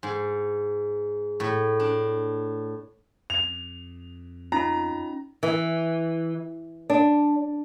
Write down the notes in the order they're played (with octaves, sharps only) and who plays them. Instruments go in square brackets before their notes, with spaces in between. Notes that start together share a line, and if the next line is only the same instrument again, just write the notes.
[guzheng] G#2
A2
D4
[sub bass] F2 [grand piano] F7
[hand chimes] C#4 D#4 F4 [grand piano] A#5
[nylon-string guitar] E3
D4